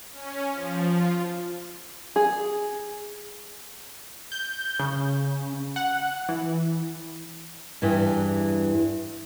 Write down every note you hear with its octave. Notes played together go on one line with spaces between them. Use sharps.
C#4
F3
F4
G#4
G6
C#3
F#5
E3
E2 G2 E3